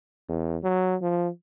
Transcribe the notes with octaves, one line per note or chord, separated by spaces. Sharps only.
E2
F#3
F3